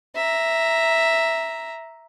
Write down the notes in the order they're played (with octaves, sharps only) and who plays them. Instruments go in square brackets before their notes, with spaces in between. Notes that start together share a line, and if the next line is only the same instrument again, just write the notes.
[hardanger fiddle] E5 A#5